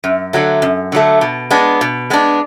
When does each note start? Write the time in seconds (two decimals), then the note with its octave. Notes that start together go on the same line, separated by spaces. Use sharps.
0.04 F#2
0.33 D3 F#3 A3
0.62 F#2
0.92 D3 F#3 A3
1.21 B2
1.51 G#3 B3 D4
1.81 B2
2.10 G#3 B3 D4